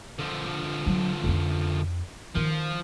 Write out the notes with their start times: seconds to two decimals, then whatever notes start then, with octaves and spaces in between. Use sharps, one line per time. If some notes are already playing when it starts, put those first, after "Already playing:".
0.19 D3 F3
0.86 F#3
1.24 F2 C#4
2.35 D#3 F3